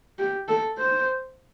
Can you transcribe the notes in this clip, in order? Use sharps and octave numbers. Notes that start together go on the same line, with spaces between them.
G4
A4
C5